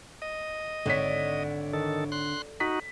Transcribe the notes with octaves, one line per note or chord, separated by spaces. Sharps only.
D#5
G#1 D3 C#5 B6
D#3 A4
C6 F#6
D#4 F#4 B6